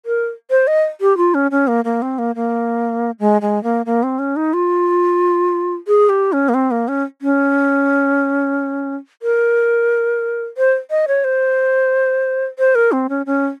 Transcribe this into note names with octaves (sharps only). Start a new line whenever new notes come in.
A#4
C5
D#5
G4
F4
C#4
C#4
A#3
A#3
C4
A#3
A#3
G#3
G#3
A#3
A#3
C4
C#4
D#4
F4
G#4
G4
C#4
A#3
C4
A#3
C#4
C#4
A#4
C5
D#5
C#5
C5
C5
A#4
C4
C#4
C#4